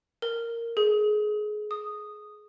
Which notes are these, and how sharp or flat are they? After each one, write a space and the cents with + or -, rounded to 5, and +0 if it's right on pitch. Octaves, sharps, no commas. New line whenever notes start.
A#4 -10
G#4 +25
D#6 -10